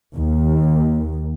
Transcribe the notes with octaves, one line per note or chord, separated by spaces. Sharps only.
D#2